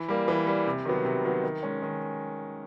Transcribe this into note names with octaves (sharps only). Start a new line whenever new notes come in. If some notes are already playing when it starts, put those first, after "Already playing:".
Already playing: E3
G3 A#3
E3
G3 A#3
C3
D#3 F#3 B3
C3
D#3 F#3 B3
D#3
G#3 C#4
D#3